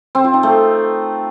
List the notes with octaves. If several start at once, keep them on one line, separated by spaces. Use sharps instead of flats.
C4
F4
D#4
A3